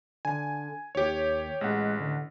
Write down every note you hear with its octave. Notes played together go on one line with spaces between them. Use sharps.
D3 G#5
D#2 G4 C#5
A1 G#3 F#5
D3